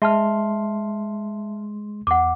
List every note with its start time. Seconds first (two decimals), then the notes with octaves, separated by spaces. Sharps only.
0.02 G#3 E5 A5 C6 F6
2.07 E2 F#5 D6